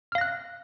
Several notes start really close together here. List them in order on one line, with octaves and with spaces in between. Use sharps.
F6 F5 A#6 F#6